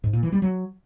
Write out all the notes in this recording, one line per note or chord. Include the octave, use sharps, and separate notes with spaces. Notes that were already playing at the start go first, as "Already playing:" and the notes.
G#2
A#2
E3
G3
F#3